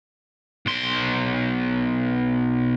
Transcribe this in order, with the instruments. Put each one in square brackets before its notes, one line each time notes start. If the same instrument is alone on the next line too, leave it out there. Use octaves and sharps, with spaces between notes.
[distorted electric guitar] B1 C6